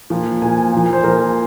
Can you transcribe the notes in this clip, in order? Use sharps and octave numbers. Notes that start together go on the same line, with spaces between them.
A#2 F3
A#2 F3 G#5
A#2 F3
C5
A#2 F3 A#4